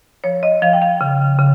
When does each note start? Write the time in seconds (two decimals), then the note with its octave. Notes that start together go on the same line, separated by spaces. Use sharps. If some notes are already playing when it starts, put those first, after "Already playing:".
0.24 F3 C#5
0.43 D#5
0.62 F3 F5
0.73 G5
0.82 F5
1.01 C#3
1.39 C#3